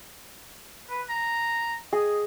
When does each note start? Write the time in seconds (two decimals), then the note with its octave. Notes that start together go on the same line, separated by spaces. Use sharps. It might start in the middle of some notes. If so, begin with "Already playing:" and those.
0.90 B4
1.09 A#5
1.93 G#4 D#5